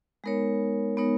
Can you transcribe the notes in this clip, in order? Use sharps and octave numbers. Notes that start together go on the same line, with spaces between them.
G#3 B3 D#4 A#4 C#5
G#3 B3 D#4 A#4 C#5